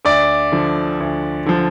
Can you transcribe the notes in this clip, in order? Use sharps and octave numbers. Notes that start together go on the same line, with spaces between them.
D2 D5
D3 F3
D2
D3 F3